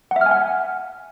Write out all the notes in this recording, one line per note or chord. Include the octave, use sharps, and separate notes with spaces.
F#5
E5
F6
G#5
F#5